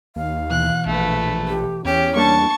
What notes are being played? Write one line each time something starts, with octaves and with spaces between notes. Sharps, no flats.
D#2 F5
B2 E3 F#6
A#1 A3 B4
G4
E2 C#4 G4
G3 A#3 D4 A5 C#6